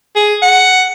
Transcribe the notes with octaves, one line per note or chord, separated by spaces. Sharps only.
G#4
F#5